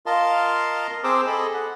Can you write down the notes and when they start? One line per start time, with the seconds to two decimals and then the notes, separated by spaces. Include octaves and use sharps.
0.06 F4 A#4 D#5 F5 A5 C6
1.04 C4 G#4 C5 A#5 D6 E6
1.27 G#4 A4 D#5 B5
1.54 F#5